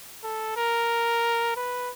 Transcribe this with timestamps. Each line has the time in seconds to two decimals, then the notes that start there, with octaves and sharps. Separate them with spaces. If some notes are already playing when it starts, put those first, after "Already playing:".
0.24 A4
0.57 A#4
1.56 B4